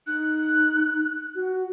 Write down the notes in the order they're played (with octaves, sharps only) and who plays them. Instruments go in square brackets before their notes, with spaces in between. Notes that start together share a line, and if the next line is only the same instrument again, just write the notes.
[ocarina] D#4 [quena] F#6
[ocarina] F#4